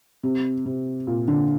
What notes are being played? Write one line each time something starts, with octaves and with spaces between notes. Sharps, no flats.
C3
C3
A#2
D3